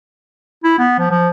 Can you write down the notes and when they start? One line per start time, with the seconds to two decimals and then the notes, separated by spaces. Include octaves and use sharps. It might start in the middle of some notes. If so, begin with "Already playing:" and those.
0.64 E4
0.79 B3
0.99 F3
1.11 F3